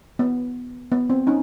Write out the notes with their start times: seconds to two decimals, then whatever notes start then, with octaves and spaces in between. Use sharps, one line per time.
0.19 B3
0.92 B3
1.10 C4
1.27 C#4 D#4